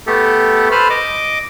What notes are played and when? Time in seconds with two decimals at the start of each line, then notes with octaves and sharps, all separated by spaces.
0.07 A3 B3 G4 A4
0.72 A4 B4 C5 B5 F6
0.90 D#5 D6